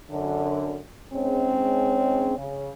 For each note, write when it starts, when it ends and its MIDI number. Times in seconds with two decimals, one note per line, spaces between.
0.11 0.80 42
0.11 0.80 50
1.14 2.38 44
1.14 2.38 56
1.14 2.38 60
1.14 2.38 61
2.38 2.70 49